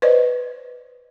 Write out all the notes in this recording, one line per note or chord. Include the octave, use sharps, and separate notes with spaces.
B4 C5 D5 D#5